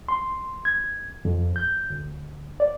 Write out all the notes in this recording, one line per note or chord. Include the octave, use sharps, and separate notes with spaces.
C6
G#6
F2
G6
D2
D5